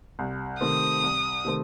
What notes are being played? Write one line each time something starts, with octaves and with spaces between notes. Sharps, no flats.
C2
C3 D#3 A3 C4 D#6
C2
C3 D#3 A3 C4